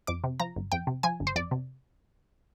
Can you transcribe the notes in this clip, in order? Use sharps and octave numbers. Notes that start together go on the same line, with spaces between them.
F2 D6
C3
F3 A#5
G1
F2 G5
C3
F3 G#5
G1
C5
F2 D5
C3